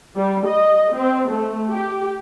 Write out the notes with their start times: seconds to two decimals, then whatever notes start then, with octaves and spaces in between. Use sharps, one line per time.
0.16 G3
0.46 D#5
0.94 C4
1.29 A3
1.70 G4